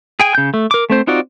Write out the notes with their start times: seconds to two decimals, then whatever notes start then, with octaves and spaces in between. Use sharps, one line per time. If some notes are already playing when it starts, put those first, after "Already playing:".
0.20 G#4 G5 G#5
0.35 C#3 G6
0.54 A3
0.71 A#4 D6
0.90 A3 C4 C5
1.07 C4 D#4 F4 F#4 D5